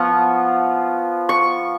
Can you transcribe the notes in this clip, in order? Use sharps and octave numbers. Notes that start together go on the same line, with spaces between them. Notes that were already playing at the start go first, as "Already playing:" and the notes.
Already playing: F3 B3 F4 C#6
C#6